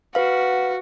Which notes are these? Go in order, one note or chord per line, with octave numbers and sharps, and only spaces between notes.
F#4 B4 F5